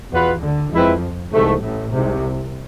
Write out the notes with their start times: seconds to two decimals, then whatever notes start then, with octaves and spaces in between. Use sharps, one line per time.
0.11 E2 B2 B3 F4 B4
0.41 D2 D3
0.71 F2 F3 G#3 C4 E4 B4
1.32 C2 G#2 C3 E3 A3
1.63 A1 A2
1.93 C2 G#2 C3